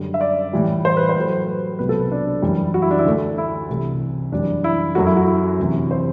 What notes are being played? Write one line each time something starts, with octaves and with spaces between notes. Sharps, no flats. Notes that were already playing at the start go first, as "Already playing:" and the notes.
Already playing: F#2 D3 G3
E5
D5
A2 E3 G3
C5
B4
C5
A2 F#3 A3
B4
C2 B2 F#3 B4
A4
B4
D4
F#2 E3 G3
F#4
E4
D4
E4
D2 D3 A3
E4
C2 C3 E3 A3
F#2 E3 G3 D4
E4
F#2 F#3 A3 F#4
E4
F#4
E4
D2 C3 E3
C5